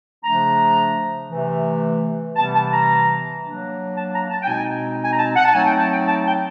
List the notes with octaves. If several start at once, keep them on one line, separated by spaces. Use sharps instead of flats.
C#3 F3 A3 D4 A#5
C3 E3 A3
C3 E3 G3 B3 A5
A5
A#5
F#3 A#3 D4
A5
A#5
A5
G5
B2 G#3 C4 D#4 G#5
G#5
A#5
A5
F#5
A5
F#3 A3 C4 D#4 G#5
G5
A5
G5
A5
G5